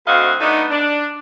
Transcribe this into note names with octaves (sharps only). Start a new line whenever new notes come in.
D2 D3 C4 F#4 D#5 F5
A3 B3 D4 D#4
D4